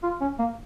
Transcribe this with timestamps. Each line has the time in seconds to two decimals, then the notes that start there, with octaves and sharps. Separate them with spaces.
0.03 F4
0.21 C#4
0.39 A#3